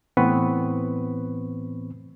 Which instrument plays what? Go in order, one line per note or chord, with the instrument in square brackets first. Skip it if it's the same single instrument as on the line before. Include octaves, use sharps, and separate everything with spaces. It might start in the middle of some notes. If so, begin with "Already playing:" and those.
[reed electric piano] A2 E3 B3 C4 B4 C#6